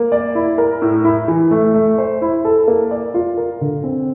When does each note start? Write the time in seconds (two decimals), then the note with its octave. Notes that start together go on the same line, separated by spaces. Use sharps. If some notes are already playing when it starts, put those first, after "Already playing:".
Already playing: A#3
0.12 D5
0.35 E4
0.58 A#4
0.82 A2
1.05 E4
1.28 E3
1.51 A3
1.74 A3
1.98 C5
2.22 E4
2.45 A4
2.68 A#3
2.91 D5
3.14 F4
3.37 A#4
3.61 D3
3.84 C4